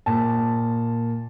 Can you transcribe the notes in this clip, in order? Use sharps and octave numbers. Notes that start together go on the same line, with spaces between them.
A#2 A5